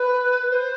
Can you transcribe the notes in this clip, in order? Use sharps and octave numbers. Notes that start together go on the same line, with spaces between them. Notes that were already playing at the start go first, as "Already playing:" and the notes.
Already playing: B4
C5